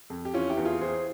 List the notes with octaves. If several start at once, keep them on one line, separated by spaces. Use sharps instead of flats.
F2
G4
E3 C#4 F4
E4 G4
E2
F4 G#4
E3 G#4 C5